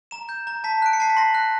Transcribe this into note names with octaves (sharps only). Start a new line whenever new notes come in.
A#5 E7
G6
A#5
A5 B6
F#6 D7
C#7
A5 C7
B6
C6 A#6
F#6